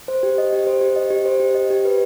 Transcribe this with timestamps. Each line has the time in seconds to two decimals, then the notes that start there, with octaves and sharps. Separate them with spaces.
0.08 C5
0.23 G4
0.38 D#5
0.53 G4
0.67 C5
0.81 G4
0.96 D#5
1.11 G4
1.25 C5
1.40 G4
1.55 D#5
1.70 G4
1.85 B4